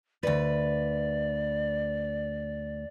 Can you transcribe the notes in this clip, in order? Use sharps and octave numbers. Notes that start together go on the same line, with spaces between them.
D2 B4 D5